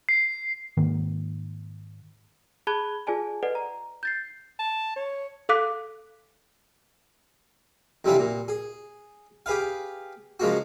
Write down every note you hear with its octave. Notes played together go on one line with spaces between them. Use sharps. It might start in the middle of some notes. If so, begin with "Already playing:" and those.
C7
G#2 D#3 A#3
G#4 A5 B5 F#6 G#6 G7
F4 G#4 D5 G#5 A5
A4 B4 D5 D#5 F#5
A#5
G6 A6 C7
A5
C#5
A4 F5 D6 F#6 B6
F2 C3 E3 G3 D4 F4
A#2
G#4
G4 G#4 B4 F5
C#3 F3 G#3 A#3 F#4